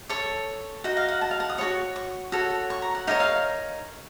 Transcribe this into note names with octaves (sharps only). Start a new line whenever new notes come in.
A4 C#5 C#6
D#4 F#4
F5
F#5
A5
F5
F#5
D#6
F#4 A4 C#5 C#6
C#6
F#4 A4 C#5
C#6
A#5
F#5
D#4 A#4 C#5 F5
F5